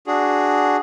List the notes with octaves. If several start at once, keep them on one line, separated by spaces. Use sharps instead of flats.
D4 F#4 G#4